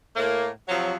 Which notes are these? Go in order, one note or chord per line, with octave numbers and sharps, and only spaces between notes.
A2 A#3
C3 F3 F#3